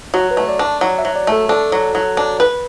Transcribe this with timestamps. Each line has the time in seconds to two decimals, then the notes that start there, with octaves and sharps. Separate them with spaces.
0.14 F#3 F#4
0.31 B4
0.37 A3
0.49 D5
0.59 D4
0.65 A5
0.81 F#3 F#5
0.98 E5
1.05 F#3
1.16 D5
1.27 A3 A4
1.49 D4 A4
1.72 F#3
1.95 F#3
2.17 D4
2.40 B4